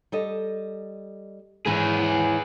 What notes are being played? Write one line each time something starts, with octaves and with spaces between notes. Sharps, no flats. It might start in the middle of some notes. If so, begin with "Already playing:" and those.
G3 A4 D#5
G#2 E3 C#4 G#4 B4